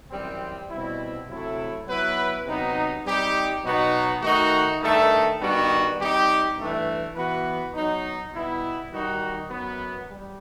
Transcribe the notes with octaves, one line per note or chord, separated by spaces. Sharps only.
F#2 E3 G3 C4
B2 G3 C4 E4
C3 F#3 A3 E4
F#3 B3 E4 B4
C3 F#3 B3 D#4
G3 C4 D#4 G4
B2 F#3 B3 D#4 F#4
D#3 A3 D#4 F#4
G2 D#3 A3 D#4 A4
G2 D#3 G3 B3 F#4
G3 C4 D#4 G4
G2 E3 A3
E3 B3 F#4 B4
F#3 B3 D#4
B2 G3 B3 E4
D#3 G3 D#4 F#4
F#2 F#3 B3
G3